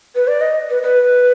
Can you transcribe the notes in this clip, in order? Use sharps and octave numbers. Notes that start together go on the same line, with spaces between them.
B4
D5
D#5
B4
B4